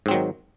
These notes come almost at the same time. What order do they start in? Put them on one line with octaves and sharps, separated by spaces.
G#2 C4 F#3 D#3